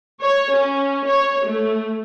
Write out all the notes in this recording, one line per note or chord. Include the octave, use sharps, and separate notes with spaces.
C#5
C#4
C#5
A3